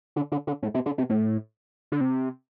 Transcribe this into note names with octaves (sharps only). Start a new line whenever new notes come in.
D3
D3
D3
A2
C3
D3
C3
A2
D3
C3